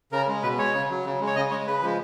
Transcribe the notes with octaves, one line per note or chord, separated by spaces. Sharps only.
C#3 A#4
G#3
B2 B4
G#3 C#5
C#3
F#3
C#3
G#3
C#5
C#3 D#5
G#3 C#5
C#3 B4
F3 G#3